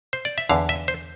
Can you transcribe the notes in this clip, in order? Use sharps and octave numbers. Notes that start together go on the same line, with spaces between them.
C5
D5
E5
E2 D3 F5
E5
C5